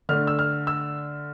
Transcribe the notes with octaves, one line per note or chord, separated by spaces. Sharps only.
D3 A3 D4 F6
E6
F6
E6